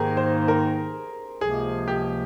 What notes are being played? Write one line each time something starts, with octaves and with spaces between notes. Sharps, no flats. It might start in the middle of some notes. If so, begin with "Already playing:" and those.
Already playing: G#2 D#3 A#3 D#4 G4 G#4 A#4
C5
A#4
C#2 C3 F3 A#3 G#4
G4